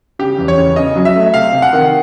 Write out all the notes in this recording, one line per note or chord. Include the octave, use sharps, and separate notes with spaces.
C#3 G4
E2
C#5
C#3
C#3 D#5
F#3
E5
A3
C3 F5
C3
F#5
D#3